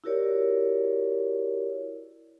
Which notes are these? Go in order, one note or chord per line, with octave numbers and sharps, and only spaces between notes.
E4 F#4 G4 A#4 C#5 D5